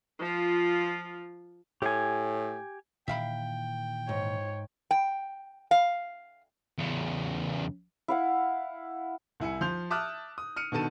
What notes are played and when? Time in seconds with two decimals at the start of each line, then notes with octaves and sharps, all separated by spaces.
0.20 F3 F4
1.82 A2 G4 G#5
3.08 A#2 D#3 E3 E5 F5 G5 B5
4.09 G#2 C#5
4.91 G5
5.71 F5
6.78 E2 C#3
8.08 E4 F5 F#5
9.40 C2 E4 G#5 C#7
9.61 F3 C6 G6 F7
9.90 E5 A5 D6 D#6 F6 F#6
10.38 D#6
10.56 F6 C#7 D#7
10.72 B2 D3 D#3 A4 A5 D#7